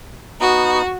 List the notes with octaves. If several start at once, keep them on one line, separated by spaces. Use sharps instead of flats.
B3 D#4 F#4